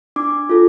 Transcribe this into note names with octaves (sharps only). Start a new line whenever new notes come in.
D4 D6
F4 A4